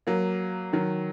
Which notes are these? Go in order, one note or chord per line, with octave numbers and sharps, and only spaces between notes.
F#3 A#3
D#3 F#3